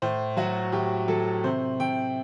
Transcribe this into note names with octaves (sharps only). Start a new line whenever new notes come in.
A2 C5
F#3 F#4
A2 G4
F#3 A4
C3 C5
C3 G5